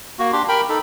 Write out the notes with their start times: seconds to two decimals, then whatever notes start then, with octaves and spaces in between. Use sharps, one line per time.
0.19 A#3 F#4
0.33 D4 G4 C6
0.48 A#4 G5 B5
0.69 D#4 A4